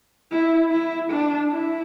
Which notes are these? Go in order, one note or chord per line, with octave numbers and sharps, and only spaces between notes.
E4
E4
D4
E4